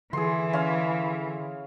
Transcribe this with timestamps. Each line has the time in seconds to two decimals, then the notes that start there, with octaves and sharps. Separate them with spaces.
0.13 D3 E3 G#4 C6
0.53 C#4 F5 C6